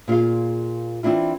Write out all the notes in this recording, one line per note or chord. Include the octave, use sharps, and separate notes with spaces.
A#2 F4 G#4 F5
E3 C4 D4 E4 F4